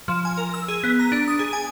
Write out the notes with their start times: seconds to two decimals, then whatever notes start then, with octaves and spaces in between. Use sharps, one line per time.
0.08 F3
0.25 G#5
0.38 A#4
0.54 E6
0.68 G#4
0.84 B3
0.99 A#5
1.12 D4
1.28 D#6
1.39 G#4
1.53 G#5